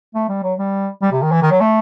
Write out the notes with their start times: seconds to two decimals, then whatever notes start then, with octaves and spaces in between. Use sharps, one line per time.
0.15 A3
0.29 G3
0.43 F#3
0.59 G3
1.02 G3
1.12 C3
1.22 D#3
1.32 E3
1.42 D#3
1.51 F#3
1.61 A3